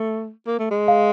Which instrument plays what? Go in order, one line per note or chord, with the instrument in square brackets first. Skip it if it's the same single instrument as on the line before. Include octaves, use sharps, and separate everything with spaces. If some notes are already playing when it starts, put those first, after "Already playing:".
Already playing: [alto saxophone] A3
A#3
A3
G#3
[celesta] F5